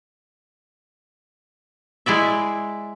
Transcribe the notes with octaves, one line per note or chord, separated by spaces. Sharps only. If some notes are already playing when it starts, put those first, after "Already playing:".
G#3 E4 D5 E5